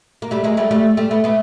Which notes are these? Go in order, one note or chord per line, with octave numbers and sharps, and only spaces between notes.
A#3
G3 A3
G#3 A#3
G3 A3
G3 A3
G3 A3
A3 B3
A3 B3